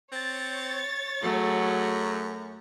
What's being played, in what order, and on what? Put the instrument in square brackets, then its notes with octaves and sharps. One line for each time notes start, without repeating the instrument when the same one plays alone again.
[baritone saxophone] C4 [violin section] C#5 A6
[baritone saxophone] F#2 [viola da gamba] F#3 [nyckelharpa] A3 G#4